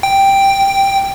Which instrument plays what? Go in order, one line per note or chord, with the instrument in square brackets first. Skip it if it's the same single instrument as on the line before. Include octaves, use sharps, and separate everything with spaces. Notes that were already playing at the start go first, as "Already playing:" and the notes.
[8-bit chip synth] G5